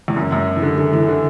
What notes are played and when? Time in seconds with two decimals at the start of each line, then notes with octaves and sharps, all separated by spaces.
0.08 E2
0.16 F#2
0.32 F#2
0.56 E3
0.62 D3
0.78 D3
0.93 E3
1.08 D3